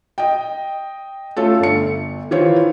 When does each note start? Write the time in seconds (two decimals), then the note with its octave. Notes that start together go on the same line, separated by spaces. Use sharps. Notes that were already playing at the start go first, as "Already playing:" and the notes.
0.18 D#5 G5
1.37 A3 C#4 F4 A4
1.59 G1 C#7
2.31 D#3 E3 E4 F4 C5 C#5